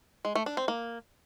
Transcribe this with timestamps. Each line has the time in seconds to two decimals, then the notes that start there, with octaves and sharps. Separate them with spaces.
0.25 G#3
0.35 A3
0.46 D4
0.57 C4
0.68 A#3